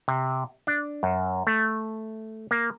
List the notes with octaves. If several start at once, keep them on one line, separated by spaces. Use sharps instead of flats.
C3
D4
F#2
A3
A#3